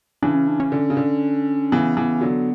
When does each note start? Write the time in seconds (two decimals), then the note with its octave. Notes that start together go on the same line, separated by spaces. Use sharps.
0.22 C#3 E3 D4
0.35 C#4
0.48 D4
0.60 C#4
0.72 D3
0.90 C#3
0.97 D3
1.72 C#3 E3 B3
1.96 C#3 E3
2.21 D3 F#3